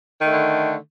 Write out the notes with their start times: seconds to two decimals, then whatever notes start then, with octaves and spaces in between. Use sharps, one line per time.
0.21 D#3
0.25 A3
0.30 D3